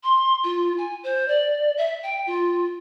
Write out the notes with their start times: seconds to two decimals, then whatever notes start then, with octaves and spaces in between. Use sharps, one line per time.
0.03 C6
0.44 F4
0.78 G#5
1.03 C5
1.28 D5
1.77 E5
2.03 G5
2.27 F4